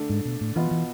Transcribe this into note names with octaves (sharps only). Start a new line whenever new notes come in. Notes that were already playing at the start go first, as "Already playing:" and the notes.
Already playing: D3 A3 D4
G#2
B2
A2
B2 E3 B3 F4
E3